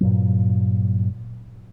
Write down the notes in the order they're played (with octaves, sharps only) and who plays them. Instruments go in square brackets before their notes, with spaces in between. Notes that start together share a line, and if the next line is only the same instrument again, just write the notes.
[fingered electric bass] G2 A#2 F#3